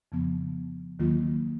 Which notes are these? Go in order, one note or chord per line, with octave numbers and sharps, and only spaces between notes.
F2 C#3 F3 B3
D#2 D#3 F#3 A#3 F4